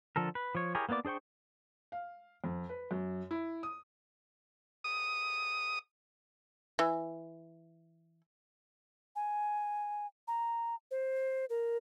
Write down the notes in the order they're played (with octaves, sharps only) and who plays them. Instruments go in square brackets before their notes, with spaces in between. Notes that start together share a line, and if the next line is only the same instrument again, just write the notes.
[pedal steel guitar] D3 F3 A4 A#4
B4
F3 C#5
E4 G4 G#4 A#4 C#5
A#3 B3 E4 D5 D6
D4 G#4 C5 G5 C#6
[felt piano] F5
F2
B4
F#2
E4
D#6
[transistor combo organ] D#6
[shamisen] E3
[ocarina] G#5
A#5
C5
A#4